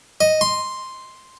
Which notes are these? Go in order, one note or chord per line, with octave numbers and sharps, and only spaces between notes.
D#5
C6